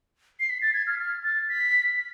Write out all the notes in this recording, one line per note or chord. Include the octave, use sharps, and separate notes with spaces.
C7
B6
A6
G#6
F6
F6
A6
B6